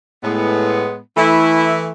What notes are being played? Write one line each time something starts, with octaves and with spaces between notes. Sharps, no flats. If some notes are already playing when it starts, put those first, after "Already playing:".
A2 G#3 B3
E3 A3 E4